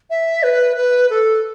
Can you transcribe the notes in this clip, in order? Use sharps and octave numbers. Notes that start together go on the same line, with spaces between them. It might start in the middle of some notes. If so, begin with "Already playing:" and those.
E5
B4
B4
A4